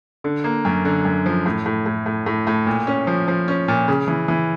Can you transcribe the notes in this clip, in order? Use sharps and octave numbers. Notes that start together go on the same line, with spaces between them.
D3
A#3
F#2
D3
F#2
F3
A2
A2
A2
A2
A2
A2
A#2
C#4
F3
F3
C#4
A#2
C#3
E3
E3